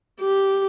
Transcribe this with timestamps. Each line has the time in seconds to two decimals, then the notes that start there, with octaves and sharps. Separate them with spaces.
0.20 G4